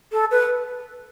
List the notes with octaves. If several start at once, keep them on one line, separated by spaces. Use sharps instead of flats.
A4
B4